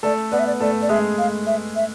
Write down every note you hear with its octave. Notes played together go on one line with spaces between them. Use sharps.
A3 A4 D5
B3 B4 D5
E5
D5
A3 A4 D5
D5
G#3 G#4 E5
F5
E5
E5